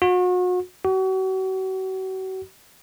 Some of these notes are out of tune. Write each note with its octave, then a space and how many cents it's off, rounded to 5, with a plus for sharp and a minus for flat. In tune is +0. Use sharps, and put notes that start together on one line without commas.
F#4 -35
F#4 +40